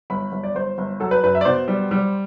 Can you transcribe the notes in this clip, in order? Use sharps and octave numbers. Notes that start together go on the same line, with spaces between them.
G1 B5
G1
D5
G1 C5
G1
F#3 A4
B4
F#2 B4
E5
D5
B2 C5
G3
G3